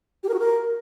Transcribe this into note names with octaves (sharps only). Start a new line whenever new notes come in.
G4
A#4
F#4
A#4